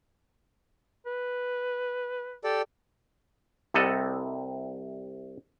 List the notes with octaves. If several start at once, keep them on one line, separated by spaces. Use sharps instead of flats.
B4
G4 A4 D5
C2 C3 G3 A4 D#5 F#5